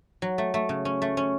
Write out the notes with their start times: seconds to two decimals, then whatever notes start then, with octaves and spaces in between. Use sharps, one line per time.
0.22 F#3
0.38 A3
0.54 A3
0.69 C#3
0.85 C#4
1.02 A3
1.17 C#4